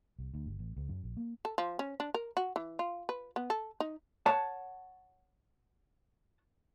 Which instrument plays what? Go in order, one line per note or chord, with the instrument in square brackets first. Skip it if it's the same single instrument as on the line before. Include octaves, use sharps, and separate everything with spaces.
[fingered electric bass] C2
D2
G1
A1
C#2
F#2
A#1
A#3
[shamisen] A4
F3
C#4
D4
A#4
F#4
E3
F4
B4
B3
A4
D#4
[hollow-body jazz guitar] C#5 F#5 A5